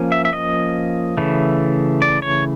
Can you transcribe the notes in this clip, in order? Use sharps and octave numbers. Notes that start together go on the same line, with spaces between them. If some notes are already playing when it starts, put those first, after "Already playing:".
Already playing: F3 A#3 C#4
E5
E5
D#5
C#3 E3 A3
D5
C#5